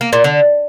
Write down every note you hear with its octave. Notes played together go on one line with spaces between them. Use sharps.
A#3
A#2
D3